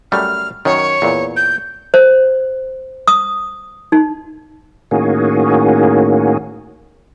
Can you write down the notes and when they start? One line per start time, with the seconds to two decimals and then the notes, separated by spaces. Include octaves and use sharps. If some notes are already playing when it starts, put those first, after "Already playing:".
0.12 F#2 G3 A3 F6
0.65 F#2 D#3 C#5
1.02 E2 A#2
1.37 G6
1.94 C5
3.08 D#6
3.92 D#4
4.91 A2 D#3 A#3 C#4 F#4 G#4